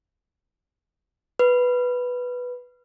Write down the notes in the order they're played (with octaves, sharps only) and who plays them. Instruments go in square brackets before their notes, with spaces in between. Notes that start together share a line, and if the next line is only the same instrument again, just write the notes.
[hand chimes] B4